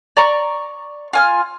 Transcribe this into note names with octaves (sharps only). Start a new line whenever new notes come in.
D5 A#5 C#6
F4 G#5 F6